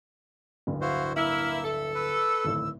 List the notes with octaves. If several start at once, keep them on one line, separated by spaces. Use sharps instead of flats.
D1 G1 G2
E4 F#4 C5 F5
A#3 E4 E6 F6
A4 E5
B4 E6
D1 G#1 A2